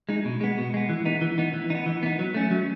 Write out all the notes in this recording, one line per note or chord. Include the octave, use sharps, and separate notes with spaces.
G#3 D#4
B2
G#3 B3
B2
G#3 B3
E3
B3 D#4
E3
B3 D#4
E3
D#4
B3
E3
B3 D#4
F#3
A3 C#4
F#3